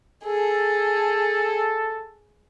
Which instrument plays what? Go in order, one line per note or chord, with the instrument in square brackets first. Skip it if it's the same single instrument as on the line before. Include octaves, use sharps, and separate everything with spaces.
[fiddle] G#4 [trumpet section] A4